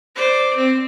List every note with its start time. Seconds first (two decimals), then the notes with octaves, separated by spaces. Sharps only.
0.15 C5 D5
0.56 C4